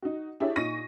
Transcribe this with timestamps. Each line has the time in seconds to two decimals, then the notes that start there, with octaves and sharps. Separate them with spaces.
0.02 D#4 F#4
0.40 D4 E4 G4 G#4 C#5 E5
0.56 A#2 D#4 C#6 A#6 D#7